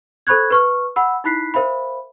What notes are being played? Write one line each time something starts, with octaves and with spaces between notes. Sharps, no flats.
A4 C5 B5 C#6 F#6 G#6
B4 C#6 F6
F#5 B5 E6
D#4 E4 B5 F#6 B6 C7
A#4 C5 E5 F5 B5